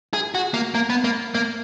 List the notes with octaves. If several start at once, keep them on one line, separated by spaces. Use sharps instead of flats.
G#4
F#4
A#3
A#3
B3
A#3
A#3